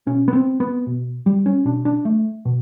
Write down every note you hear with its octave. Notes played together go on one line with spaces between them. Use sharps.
B2 C#4
B3
C4
B3
B2
G3
C#4
B2 D4
D4
A3
B2